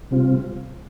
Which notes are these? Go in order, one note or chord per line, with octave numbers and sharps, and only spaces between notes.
C3 G3 C4 F4